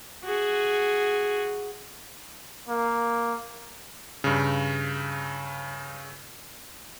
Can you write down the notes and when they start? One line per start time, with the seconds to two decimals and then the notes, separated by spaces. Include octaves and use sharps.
0.25 F#4 G#4
2.68 A#3
4.24 G2 C#3